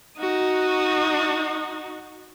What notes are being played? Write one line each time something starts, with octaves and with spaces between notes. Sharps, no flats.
D#4 F#4